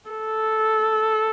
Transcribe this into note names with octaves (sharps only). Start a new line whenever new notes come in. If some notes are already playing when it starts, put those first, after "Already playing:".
A4